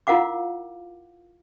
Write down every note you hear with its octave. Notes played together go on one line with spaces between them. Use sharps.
E4 F4 A#4 F5 F#5 D6